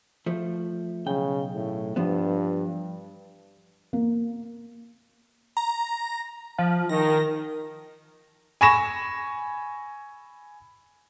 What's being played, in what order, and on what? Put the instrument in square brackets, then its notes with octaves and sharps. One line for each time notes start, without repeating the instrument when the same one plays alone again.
[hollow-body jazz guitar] F3 A3
[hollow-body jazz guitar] B1 G5 [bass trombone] C#3
[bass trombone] A2
[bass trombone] G2 [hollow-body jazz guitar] F3 B3
[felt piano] A#3
[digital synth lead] A#5
F3
[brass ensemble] D#3 [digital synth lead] A#6
[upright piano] G#5 B5 C#6 A#6 E7